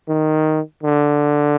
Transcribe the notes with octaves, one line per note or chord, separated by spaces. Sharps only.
D#3
D3